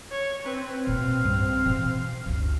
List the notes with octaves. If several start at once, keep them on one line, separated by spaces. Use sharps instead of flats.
C#5
C4 B4
B2 A#3 F5
C2 G2
B2 E3
G1 D2